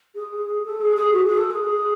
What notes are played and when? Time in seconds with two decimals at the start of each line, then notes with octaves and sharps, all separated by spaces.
0.15 G#4
0.65 A4
0.80 G#4
0.96 G#4
1.13 F#4
1.25 G#4
1.37 A4
1.50 G#4